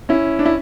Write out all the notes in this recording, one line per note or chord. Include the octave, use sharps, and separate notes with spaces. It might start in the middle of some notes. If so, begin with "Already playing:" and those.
C#4 E4
D4
E4